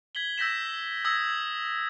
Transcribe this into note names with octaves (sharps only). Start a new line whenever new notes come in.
G#6 B6 F#7 G7
E6 G6 A#6 B6 E7
D#6 E6 G#6 A#6